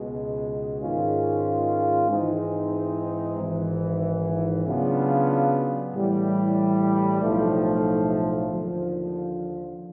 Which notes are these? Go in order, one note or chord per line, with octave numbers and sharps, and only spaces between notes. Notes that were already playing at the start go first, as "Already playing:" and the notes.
Already playing: C#2 B2 G#3
G#2 D#3 G#3 C#4 F4
G#2 E3 G#3 C4 D#4
G#1 G#2 E3
C#3 F#3 B3 D4 F4
A2 E3 G3
B1 A2 F3 A3
D#2 D3 F3